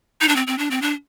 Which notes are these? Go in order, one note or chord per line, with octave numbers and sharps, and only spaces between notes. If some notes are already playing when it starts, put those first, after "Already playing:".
D#4
D4
C4
C4
D4
C4
D4